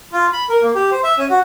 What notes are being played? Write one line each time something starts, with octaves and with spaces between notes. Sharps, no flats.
F4
B5
A#4
A#3
G4
C5
E5
C#4
F#4